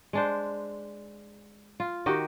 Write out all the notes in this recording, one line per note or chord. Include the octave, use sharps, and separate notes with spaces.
G#3 D4 C5
F4
D#3 F#4 G4 D#5